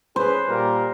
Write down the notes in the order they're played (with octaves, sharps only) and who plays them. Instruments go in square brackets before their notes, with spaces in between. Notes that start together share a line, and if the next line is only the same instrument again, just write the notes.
[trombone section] C#4 G#4 B4 [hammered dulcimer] C5
[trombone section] A#2 G3 A#4